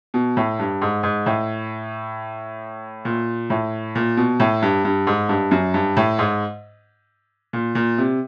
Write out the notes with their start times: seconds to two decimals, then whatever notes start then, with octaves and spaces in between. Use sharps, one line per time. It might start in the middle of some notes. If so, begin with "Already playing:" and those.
0.14 B2
0.37 A2
0.59 G2
0.82 G#2
1.03 G#2
1.26 A2
3.05 A#2
3.50 A2
3.95 A#2
4.17 B2
4.40 A2
4.62 G2
4.85 G2
5.07 G#2
5.29 G2
5.51 F#2
5.74 G2
5.97 A2
6.19 G#2
7.53 A#2
7.75 A#2
7.98 C3